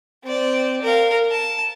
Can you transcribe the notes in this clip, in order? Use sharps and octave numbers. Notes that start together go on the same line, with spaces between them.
C4 D5
A#4 F5
A5